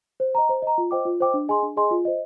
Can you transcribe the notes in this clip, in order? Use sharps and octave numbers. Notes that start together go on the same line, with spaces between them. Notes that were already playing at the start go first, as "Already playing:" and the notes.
C5
D#5 A#5
C5
D#5 A#5
F4
C5 D#5 G5 D6
F4
C5 D#5 G5 D6
D4
G#4 D#5 G#5 C6
D4
G#4 D#5 G#5 C6
F4
C5 D#5